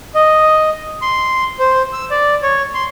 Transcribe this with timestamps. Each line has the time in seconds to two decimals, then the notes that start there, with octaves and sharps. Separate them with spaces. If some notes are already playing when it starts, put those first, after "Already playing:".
0.15 D#5
1.02 C6
1.59 C5
1.93 E6
2.11 D5
2.43 C#5
2.74 C6